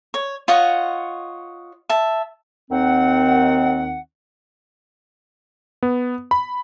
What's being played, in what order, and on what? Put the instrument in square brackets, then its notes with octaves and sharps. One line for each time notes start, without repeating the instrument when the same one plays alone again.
[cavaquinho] C#5
F4 C#5 D#5 F#5
E5 A5
[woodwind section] D#2 D#3 C4 F#5
[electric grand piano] B3
B5